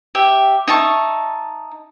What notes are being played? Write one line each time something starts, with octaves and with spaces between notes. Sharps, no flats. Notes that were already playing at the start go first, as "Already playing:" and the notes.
G4 E5
D#4 E5 A5 C#6